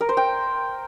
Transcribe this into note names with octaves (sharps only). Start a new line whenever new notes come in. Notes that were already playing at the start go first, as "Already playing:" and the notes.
A#4
C5
G5